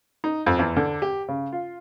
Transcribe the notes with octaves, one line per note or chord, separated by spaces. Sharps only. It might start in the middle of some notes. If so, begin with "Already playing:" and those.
D#4
F2
E2
D3
G4
C#3
F4